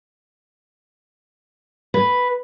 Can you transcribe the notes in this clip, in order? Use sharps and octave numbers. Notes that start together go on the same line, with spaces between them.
B4